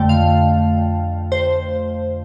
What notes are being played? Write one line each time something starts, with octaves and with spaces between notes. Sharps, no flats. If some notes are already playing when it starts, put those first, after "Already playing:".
Already playing: F2 D3 A3 G5 A5
F5
C5